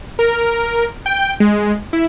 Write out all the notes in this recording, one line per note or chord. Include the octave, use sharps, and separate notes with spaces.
A#4
G5
G#3
E4